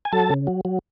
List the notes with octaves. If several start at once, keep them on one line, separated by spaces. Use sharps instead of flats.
G#5
F#3 A4 A5
C#3
F#3
F#3